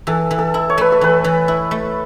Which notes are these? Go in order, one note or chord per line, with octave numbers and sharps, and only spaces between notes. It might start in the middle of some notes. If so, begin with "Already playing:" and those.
E3 A4
E3
A4
E4
C#5
A3 B4
A4
E3 B4
E3
E4
A3